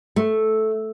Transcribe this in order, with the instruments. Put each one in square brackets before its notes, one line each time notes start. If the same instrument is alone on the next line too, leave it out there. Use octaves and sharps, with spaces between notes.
[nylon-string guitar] A3